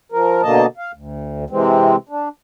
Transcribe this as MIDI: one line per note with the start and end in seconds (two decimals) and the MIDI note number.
0.12 0.42 53
0.12 0.42 70
0.42 0.66 47
0.42 0.66 50
0.42 0.66 58
0.42 0.66 75
0.42 0.66 81
0.77 0.92 77
0.94 1.45 38
1.50 1.96 48
1.50 1.96 52
1.50 1.96 56
1.50 1.96 60
2.09 2.29 62